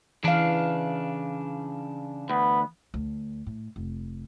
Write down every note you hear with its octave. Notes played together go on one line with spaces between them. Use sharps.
C#3 E3 D4 F5
D2 B3
D2
A2
F1